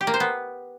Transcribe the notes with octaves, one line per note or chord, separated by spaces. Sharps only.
G4
A#3
C5
B3